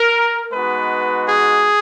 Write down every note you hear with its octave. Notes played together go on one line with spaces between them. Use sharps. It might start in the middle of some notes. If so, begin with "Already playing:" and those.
Already playing: A#4
G#3 B3 D#4 F#4 B4
G#4